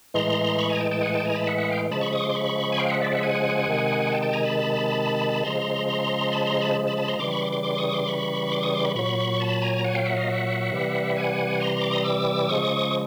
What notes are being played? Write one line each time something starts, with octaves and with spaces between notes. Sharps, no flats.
A2 E3 G#3 A#5 C6
B5 C#6
G#5 A#5
G5 A5
G5 A5
F#5 G#5
G5 A5
G#5 A#5
A5 B5
E5 F#5
E5 F#5
F5 G5
C#3 F3 G#3 A5 B5
B5 C#6
C#6 D#6
C6 D6
B5 C#6
G#5
F5 G5
E5 F#5
D5 E5
E5 F#5
F#5 G#5
C3 D#3 G#3
G5 A5
G5 A5
G#5 A#5
A5 B5
C#3 F3 G#3 A#5 C6
A#5 C6
A5 B5
A#5 C6
A5 B5
A5 B5
A5 B5
A#5 C6
C#3 E3 G3 C6 D6
B5 C#6
C6 D6
C6 D6
C6 D6
C#6 D#6
C6 D6
B5 C#6
C6 D6
C#6 D#6
C6 D6
B5 C#6
A#2 F#3 B5 C#6
A5 B5
G#5 A#5
F#5 G#5
F5 G5
E5 F#5
D#5 F5
E5 F#5
C3 E3 G3
F#5 G#5
A#5 C6
D6
D#6
D6 E6
C#3 F3 G#3 C#6 D#6